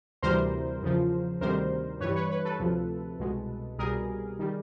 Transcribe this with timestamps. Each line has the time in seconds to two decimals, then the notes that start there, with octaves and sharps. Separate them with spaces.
0.22 D2 C3 E3 G3 A#4 C5
0.82 E2 C#3 F3
1.41 D2 C3 D#3 G3 A#4 C5
2.00 G2 E3 G3 B4 C#5
2.15 B4 C#5
2.30 B4 C#5
2.45 A4 B4
2.60 D2 C3 F3
3.19 C2 B2 G#3
3.79 C2 B2 G3 G#4 A#4
4.39 D#3 G3